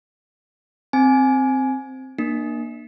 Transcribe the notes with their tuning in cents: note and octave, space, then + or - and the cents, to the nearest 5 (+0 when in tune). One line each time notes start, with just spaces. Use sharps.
C4 +0 G#5 +15
A#3 +15 D4 +35